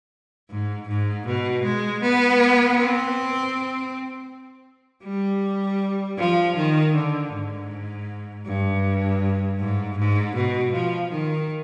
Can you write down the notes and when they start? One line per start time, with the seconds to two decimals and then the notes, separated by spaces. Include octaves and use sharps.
0.50 G#2
0.88 G#2
1.26 B2
1.63 G#3
2.02 B3
2.77 C4
5.04 G3
6.18 F3
6.56 D#3
6.94 D3
7.33 G#2
8.46 G2
9.59 G#2
9.97 G#2
10.36 B2
10.73 F3
11.11 D#3